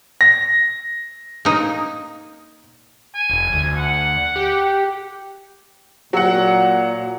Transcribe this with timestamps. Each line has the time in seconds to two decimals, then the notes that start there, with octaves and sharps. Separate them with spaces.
0.21 A#6
1.45 A#3 D#4
3.15 G#5
3.30 F1
3.53 D2
3.76 F#5
4.36 G4
6.13 A#2 F#3 F#5